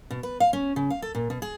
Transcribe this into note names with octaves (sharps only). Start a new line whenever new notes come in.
B2
B4
F5
C#4
C#3
F5
A4
A#2
B2
G#4